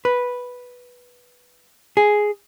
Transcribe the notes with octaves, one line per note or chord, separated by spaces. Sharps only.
B4
G#4